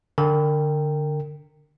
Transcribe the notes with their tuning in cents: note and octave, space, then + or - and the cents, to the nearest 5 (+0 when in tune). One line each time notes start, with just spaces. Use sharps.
D3 +0 A#4 -25 G5 +0